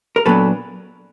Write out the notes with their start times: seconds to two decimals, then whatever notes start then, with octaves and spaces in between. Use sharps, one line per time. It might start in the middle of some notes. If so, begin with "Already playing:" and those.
0.16 A#4
0.26 A#2 F#3 B3 D4 A4 B4